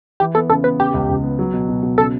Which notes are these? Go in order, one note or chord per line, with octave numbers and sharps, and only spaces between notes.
E3 G4
B3 A4
C#3 A4
B3 B4
C#3 G4
C#2
C#2
B3
F#3
B2
B2
B2
C#3 A4